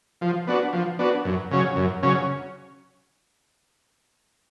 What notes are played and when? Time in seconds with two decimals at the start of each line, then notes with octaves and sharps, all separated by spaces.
0.21 F3
0.47 B3 D4 F#4
0.73 F3
0.99 B3 D4 F#4
1.25 F#2
1.51 C#3 F#3 C#4
1.76 F#2
2.03 C#3 F#3 C#4